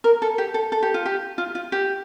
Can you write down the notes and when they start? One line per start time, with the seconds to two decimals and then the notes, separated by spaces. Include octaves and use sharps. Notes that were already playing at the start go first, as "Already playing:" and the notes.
0.04 A#4
0.22 A4
0.38 G4
0.54 A4
0.72 A4
0.83 G4
0.94 F4
1.06 G4
1.38 F4
1.55 F4
1.72 G4